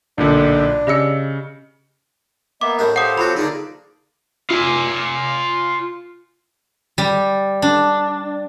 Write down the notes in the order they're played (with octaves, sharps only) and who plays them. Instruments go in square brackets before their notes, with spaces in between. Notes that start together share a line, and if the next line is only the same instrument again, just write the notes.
[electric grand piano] B1 A#2 D3 [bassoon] D4
[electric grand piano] C#3 C#7 [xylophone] G4 D#5 E6
[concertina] A#3 B3 E5 [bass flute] D#5 [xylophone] D6
[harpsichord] A2 G3 D4 [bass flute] A#4
[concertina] G4 A4 C5 [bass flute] F5 [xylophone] F#5 D#6
[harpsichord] F2 F#3 F#4 [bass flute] F4 [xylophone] B5
[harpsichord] D3 A#3 G#4 [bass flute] D#4 [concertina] D5
[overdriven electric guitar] F4 G#5
[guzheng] G3
D4